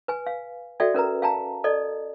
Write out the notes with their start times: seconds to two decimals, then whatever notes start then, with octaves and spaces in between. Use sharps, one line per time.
0.08 B4 G#5
0.27 F5
0.80 F#4 A4 D5 E5 G5
0.94 C#4 A#4 B4 A#5
1.22 F5 G5 A5 A#5
1.64 A4 D5 D#5